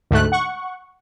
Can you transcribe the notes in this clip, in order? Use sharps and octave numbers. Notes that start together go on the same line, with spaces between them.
D2 G#2 A3 F#6
F#5 C#6